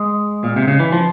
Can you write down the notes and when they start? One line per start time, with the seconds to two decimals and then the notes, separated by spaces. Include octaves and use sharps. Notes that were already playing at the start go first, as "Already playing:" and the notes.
Already playing: G#3
0.44 A#2
0.56 C3
0.68 C#3
0.80 E3
0.92 F3